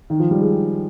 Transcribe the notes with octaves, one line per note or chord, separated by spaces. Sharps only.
D#3
F3
G3
G#3